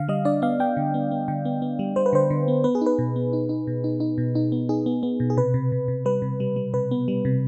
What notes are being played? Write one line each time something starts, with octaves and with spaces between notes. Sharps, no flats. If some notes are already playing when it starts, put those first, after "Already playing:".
Already playing: D3 F5
G3 D#5
D4 D5
B3 F5
B3 G5
D3
B3
B3
D3 G5
B3
B3
G3
G3 C5
B4
D3 C5
D3
B3
B3 B4
G#4
D#4
B4
B2
B3
D#4
D#4
B2
D#4
D#4
B2
D#4
B3
D#4 G#4
B3
B3
B2
G#4
C3 B4
C3
C3
C3
G3 B4
C3
G3
G3
C3 B4
B3
G3
C3